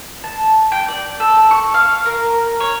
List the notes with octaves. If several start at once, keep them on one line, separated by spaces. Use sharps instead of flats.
A5
G5
D5
A4
C#6
F5
A#4
C#5